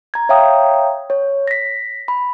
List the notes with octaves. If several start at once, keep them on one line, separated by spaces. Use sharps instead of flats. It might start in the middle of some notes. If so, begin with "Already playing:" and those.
A#5 G#6
C#5 E5 F5 G5 A#5 D#6
C#5
A#6 B6
B5